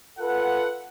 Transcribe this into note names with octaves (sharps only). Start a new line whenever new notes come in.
F4 A4 B4 F#5